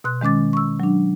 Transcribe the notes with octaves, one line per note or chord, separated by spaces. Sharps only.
B2 C6 F#6
D#3 G#3 C#4 D6 A6
C#6 E6
F#3 D4